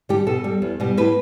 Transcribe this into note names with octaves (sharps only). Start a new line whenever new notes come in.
D3 G3 G4
B2 A4
G3
E2
B2 G3
A2 B4